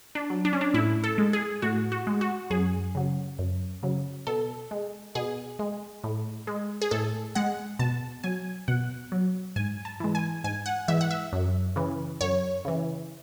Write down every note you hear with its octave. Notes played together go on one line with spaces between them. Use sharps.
D4
F#3
D4
C#4
D4
A2 E4
A4
G#3
G#4
A2 F#4
F#4
G#3
F#4
F#2 G#4
C#3 F#3
F#2
C#3 F#3
B2 A4
G#3
B2 G#4
G#3
A2
G#3
G#4
A2 A4
G#3 F#5
B2 A5
F#3 G#5
B2 F#5
F#3
G#2 G#5
A5
E3 G#3
G#5
G#2 G#5
F#5
E3 G#3 E5
F#5
E5
F#2
C#3 E3
F#2 C#5
C#3 E3